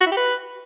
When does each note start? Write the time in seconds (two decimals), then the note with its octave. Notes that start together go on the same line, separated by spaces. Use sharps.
0.01 F#4
0.06 E4
0.12 G4
0.17 B4